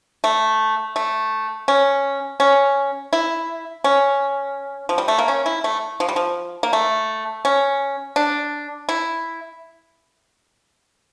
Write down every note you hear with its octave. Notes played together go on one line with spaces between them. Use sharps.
A3
A3
C#4
C#4
E4
C#4
F3
G3
A3
A#3
C#4
E4
A3
F3
G3
F3
A#3
A3
C#4
D4
E4